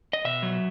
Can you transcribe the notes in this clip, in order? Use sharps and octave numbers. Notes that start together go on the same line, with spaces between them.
D#5
B2 E5
F#3